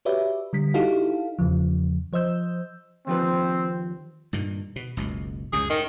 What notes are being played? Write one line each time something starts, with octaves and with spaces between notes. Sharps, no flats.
F#4 G4 B4 C#5 D5 E5
D3 G3 B6
D#4 E4 F#4 G4 A4 F5
E2 C#3 F3
F3 C5 D#5 E6 G6
D#2 F3 C4 B4
G2 A#2 D#3
B2
F#1 C#2 B2
C#2 F#2 C#3 G#4
A2 D#3